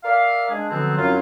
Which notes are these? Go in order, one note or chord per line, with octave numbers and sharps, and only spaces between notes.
A#4 D5 E5 F5
G#3 D4 G#4
B2 D3 F3 F#3 B3 C4
F#2 F#3 C4 E4 F4